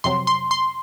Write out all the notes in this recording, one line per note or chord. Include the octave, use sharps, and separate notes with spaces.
F2 C3 F#3 C4 C6
C6
C6